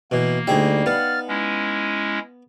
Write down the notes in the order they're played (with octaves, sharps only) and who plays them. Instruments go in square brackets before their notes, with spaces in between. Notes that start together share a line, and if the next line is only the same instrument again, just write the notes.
[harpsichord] B2 E3 [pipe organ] A#3
[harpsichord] D2 G#4 E5 [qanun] G3 D#4
[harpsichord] B3 [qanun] F5 F#5 [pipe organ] F6 A6
[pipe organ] G#3 C#4 E4